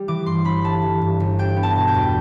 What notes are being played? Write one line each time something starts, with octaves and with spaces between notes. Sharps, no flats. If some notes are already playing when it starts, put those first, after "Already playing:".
Already playing: G3
E3 D6
G2 C6
G1 B5
G3 A5
E3
G2
G1
D4 G5
B3
A5
B2
G5
E2